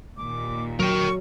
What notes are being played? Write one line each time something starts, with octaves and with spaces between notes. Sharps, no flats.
D#2 A#2 D6
F#3 A#4 G5 C#6